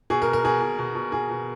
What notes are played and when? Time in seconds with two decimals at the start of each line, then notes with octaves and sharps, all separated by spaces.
0.10 B2 G#4
0.22 A#4
0.27 B2
0.33 A#4
0.44 B2 G#4
0.62 B2
0.78 B2
0.95 B2
1.12 B2 G#4
1.30 B2